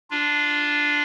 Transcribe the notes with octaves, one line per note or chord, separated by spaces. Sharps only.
D4 F4